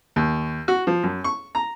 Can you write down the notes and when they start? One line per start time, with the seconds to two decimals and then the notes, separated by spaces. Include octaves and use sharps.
0.16 D#2
0.68 F#4
0.87 F3
1.03 F#2
1.24 C#6
1.55 A#5